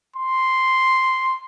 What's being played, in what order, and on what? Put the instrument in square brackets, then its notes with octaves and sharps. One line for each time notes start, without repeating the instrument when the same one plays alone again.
[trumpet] C6